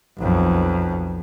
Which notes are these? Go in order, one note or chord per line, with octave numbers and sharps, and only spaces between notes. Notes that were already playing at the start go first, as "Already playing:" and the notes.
B1 F2